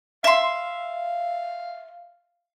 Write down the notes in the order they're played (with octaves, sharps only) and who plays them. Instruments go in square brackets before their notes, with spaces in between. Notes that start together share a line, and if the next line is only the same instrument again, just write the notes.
[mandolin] E5 C6 [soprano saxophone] F5